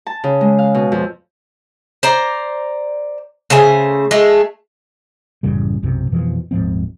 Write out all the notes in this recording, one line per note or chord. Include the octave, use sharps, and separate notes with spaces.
A5
C#3
G#3
F5
B2
F2
C5 D5 A#5
C#3 A3 C5 G#5
G#3 A3
A1 F#2 C#3 G3
B1 F#2 C3
F2 B2 E3 F3
D#1 G#2 F3 C4